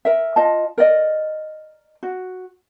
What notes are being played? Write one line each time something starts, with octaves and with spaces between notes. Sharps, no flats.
A#4 E5
F4 D#5 A5
A#4 D5 D#5
F#4